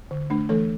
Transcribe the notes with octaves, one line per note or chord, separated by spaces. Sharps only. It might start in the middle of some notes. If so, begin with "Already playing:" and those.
D3
A3 D4
E3 A3 A4